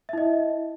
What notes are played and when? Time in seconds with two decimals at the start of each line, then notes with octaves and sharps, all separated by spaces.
0.09 E5
0.13 E4
0.18 D#5